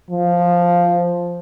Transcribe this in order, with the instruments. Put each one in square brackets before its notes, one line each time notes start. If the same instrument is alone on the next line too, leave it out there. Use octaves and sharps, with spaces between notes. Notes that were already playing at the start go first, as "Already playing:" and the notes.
[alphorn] F3